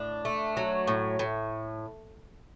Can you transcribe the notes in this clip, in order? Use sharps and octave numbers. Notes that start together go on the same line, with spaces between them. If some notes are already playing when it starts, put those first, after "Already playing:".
Already playing: A2 D4
A3
F#3
A2
A2